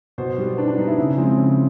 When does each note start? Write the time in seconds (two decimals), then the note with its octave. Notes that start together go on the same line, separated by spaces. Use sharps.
0.18 B2 C5
0.38 G3 B3
0.58 B2 D4
0.68 D4
0.78 G3 B3 D#4
0.88 E4
0.98 C#3
1.18 F3 G#3 C4
1.38 C#3